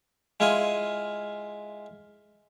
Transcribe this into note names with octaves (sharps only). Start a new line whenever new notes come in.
G#3 E4 F4 F5 G#5